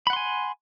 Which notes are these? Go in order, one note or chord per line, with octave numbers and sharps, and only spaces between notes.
F#5 G#5 B5 C6